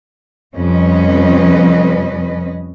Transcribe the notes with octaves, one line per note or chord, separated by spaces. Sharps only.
F2 C3 G3 C#4 B4 D#5